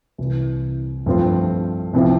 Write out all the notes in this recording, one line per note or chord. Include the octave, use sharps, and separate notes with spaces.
C2 C3 E3
G2 F3 A3 C4 F4
C2 C3 F3 C4 E4